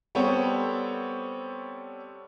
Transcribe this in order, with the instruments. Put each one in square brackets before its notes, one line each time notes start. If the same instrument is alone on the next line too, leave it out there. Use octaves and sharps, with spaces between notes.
[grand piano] G3 B3 C4 A4 C5 C#5